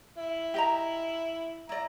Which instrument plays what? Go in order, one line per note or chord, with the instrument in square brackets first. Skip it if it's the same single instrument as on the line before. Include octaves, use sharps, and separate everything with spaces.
[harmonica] E4
[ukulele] G4 D#5 A#5
[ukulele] E4 D5 [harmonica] A#5